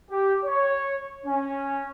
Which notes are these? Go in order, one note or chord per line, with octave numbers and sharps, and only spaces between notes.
G4
C#5
C#4